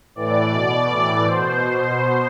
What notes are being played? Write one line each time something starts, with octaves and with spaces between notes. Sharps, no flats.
A2 E3 D5
B2 D5
A2 E3
B2 C5
B2 C5